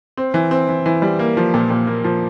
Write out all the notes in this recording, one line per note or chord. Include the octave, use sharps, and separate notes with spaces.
C4
E3
C4
E3
E3
G3
A#3
F3
A#2
A#2
A#3
F3